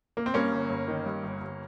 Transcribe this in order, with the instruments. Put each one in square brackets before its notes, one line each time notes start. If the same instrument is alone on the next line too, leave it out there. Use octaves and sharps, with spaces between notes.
[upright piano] A#3
C4
G2 A#3 C#4
G1
G1
D#3
G2
G1
G1